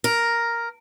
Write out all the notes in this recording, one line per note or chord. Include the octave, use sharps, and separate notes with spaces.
A#4